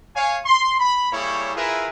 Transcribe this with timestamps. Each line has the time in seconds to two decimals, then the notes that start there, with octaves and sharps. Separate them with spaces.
0.14 C#5 F5 G#5
0.45 C6
0.79 B5
1.12 G3 A#3 E4 G#4 C#5
1.55 E4 F4 G#4 A#4 B4 E5